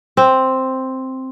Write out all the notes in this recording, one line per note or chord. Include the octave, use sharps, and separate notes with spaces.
C4